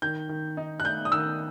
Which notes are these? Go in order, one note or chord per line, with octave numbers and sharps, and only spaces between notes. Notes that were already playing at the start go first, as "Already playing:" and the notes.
D#3 G6
D#3
D#4
F#6
A3 G6
D#6
D#3 E6